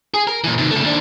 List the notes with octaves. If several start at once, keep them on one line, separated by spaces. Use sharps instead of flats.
G#4
A#4
A#2 E3
C3 D#3
C#3 A3
D#2 D4